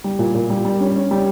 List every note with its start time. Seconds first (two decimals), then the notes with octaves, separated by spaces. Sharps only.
0.04 G3
0.19 A#2
0.34 A#2
0.50 G3
0.65 G3
0.81 C#4
0.96 C#4
1.11 G3